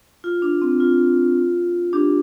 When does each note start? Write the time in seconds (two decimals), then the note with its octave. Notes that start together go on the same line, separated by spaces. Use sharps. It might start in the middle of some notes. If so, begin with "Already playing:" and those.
0.24 F4
0.42 D4
0.62 C4
0.80 F4
1.93 D4 G4